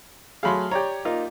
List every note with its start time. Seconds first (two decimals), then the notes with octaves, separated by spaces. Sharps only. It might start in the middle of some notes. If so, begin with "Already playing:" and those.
0.43 F#3 A3 G#4 F5 B5 C6
0.71 G4 C#5 D5 A#5
1.05 A#3 D#4 F4